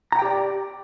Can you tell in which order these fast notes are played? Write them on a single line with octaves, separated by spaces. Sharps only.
A#5 F#5 G5 G4 D5